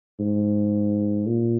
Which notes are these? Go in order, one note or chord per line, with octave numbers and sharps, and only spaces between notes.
G#2
A#2